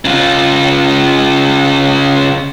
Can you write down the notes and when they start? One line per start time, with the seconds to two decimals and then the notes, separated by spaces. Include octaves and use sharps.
0.05 C#3 F4